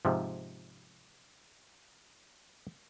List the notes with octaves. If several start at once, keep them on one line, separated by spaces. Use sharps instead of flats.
G#2 C3 F3